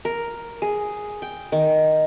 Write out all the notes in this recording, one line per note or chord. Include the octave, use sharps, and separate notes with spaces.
A#4
G#4
G5
D#3